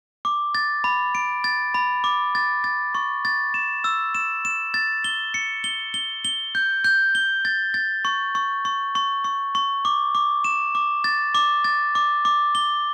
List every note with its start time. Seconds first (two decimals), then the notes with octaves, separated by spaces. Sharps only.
0.25 D6
0.55 A6
0.84 B5
1.15 D7
1.44 A6
1.74 B5
2.04 D6
2.35 A6
2.64 A6
2.95 C#6
3.25 A6
3.54 E7
3.84 E6
4.15 E7
4.45 E7
4.74 A6
5.04 G7
5.34 C#7
5.64 G7
5.94 G7
6.25 G7
6.55 G6
6.84 G6
7.15 G7
7.45 A6
7.74 A6
8.05 C#6
8.35 C#6
8.65 C#6
8.95 C#6
9.24 C#6
9.55 C#6
9.85 D6
10.15 D6
10.44 E7
10.75 D6
11.04 A6
11.35 D6
11.64 A6
11.95 D6
12.25 D6
12.55 G7